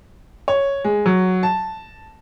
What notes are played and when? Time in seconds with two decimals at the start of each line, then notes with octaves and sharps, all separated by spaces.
0.48 C#5
0.84 G#3
1.06 F#3
1.43 A5